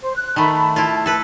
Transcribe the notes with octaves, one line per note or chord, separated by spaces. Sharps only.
C5
F#6
D#3 A3 A5 B5
E4 F4
A4 B4